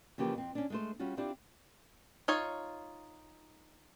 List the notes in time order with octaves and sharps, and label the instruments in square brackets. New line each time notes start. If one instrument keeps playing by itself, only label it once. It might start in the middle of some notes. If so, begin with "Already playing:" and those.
[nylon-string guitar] C#3 E3 F3 A#3 G4
F2 C4
C#4 D4
G#3 A3 C5
G3 C#4 F4 F#4
C4 D4 E4 F4 G4 D5
[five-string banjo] D#4 F4 C#5